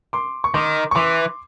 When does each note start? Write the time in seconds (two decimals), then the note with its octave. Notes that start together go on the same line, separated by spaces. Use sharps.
0.13 C6 D6
0.44 C#6
0.54 D#3 C6 D6
0.91 C#6
0.95 E3 C6 D6